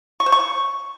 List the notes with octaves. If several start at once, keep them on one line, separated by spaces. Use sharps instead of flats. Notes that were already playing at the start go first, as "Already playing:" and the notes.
C#6
C5
C#6